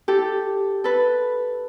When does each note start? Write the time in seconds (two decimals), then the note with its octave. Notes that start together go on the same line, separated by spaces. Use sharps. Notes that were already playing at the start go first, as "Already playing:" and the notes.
0.08 G4 A4
0.84 A4 B4